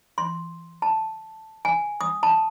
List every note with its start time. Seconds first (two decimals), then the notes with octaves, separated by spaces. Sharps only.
0.18 C6
0.82 A5
1.65 G#5
2.01 D#6
2.23 A5